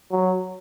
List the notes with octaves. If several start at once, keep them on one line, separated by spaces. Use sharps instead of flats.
F#3